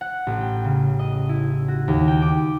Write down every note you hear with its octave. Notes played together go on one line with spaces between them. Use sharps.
F#5
A1
G5
C#3
D#5
E4
F#4
D#2
G5
D6